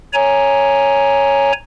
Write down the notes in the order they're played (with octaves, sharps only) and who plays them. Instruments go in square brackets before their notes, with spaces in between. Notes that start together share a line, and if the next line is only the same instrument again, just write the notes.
[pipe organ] C#5 G#5 A#5